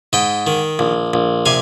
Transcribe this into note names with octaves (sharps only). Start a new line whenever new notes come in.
G#2 D#5 G5
D#3
A#1
A#1
C3 F5 G#5